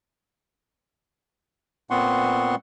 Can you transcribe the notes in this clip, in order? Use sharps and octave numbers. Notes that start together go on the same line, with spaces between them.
A#2 B3 C4 F#5 C6 C#6